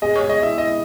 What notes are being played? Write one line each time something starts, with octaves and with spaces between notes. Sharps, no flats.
G#4 D#5
G#4 C#5
D#5
E4 E5
E4 D#5